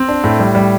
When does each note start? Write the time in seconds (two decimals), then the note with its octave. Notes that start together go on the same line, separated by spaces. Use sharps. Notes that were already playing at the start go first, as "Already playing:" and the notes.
Already playing: C4
0.08 D4
0.24 A2
0.39 G3
0.55 G3